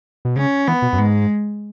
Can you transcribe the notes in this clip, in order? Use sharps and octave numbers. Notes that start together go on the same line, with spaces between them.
B2
C#3 C#4
E3 B3
B2
F#2
G#2 G#3